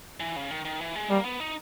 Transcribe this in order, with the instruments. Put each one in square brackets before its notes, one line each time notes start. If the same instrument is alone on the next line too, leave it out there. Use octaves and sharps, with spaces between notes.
[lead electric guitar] E3
C#3
D#3
D#3
E3
G#3
[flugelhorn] G3 [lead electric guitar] A#3
[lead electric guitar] B3
D#4